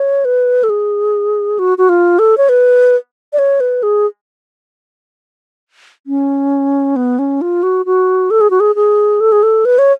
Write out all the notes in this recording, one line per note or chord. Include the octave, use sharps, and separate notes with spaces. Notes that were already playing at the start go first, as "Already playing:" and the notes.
Already playing: C#5
B4
A4
G#4
F#4
F#4
F4
A4
C#5
B4
D5
C#5
B4
G#4
C#4
B3
C#4
F4
F#4
F#4
A4
G#4
F#4
G#4
G#4
A4
G#4
A4
B4
C#5